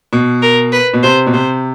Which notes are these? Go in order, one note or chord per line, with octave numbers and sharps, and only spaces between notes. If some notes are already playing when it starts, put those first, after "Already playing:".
B2
A#4
B4
B2
C3 C5
B2
C3 C5